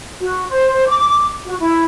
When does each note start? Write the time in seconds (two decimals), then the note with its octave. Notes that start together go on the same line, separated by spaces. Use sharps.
0.20 F#4
0.49 C5
0.87 D6
1.44 F#4
1.58 E4